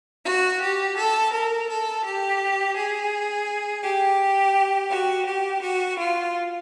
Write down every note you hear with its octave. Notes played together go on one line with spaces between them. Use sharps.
F#4
G4
A4
A#4
A4
G4
G#4
G4
F#4
G4
F#4
F4